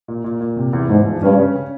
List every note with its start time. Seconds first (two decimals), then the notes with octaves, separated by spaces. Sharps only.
0.08 A#2
0.24 A#2
0.40 A#2
0.57 C3
0.73 E2
0.89 E2 G#2
1.06 F3
1.22 G2 C#4
1.39 C#3
1.55 C#3